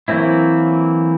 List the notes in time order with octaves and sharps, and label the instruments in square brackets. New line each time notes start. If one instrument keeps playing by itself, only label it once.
[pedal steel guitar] E3 F#3 A#3 C4 E4